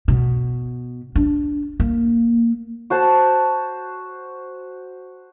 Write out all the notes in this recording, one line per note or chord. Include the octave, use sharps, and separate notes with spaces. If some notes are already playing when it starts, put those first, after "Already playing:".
B2
D4
A#3
F#4 C5 A5